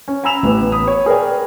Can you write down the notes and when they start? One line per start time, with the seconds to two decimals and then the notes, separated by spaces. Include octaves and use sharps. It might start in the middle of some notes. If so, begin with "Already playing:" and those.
0.08 C#4
0.24 G#5 A#5 B5 E6 E7 F7
0.43 A1 B3
0.72 B5 D#6
0.87 C#5
1.06 G#4 A#4 B4 D5 G5 G#5